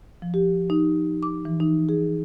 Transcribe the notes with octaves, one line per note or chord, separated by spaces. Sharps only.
F3
G4
D#4
D6
E3
D#4
G#4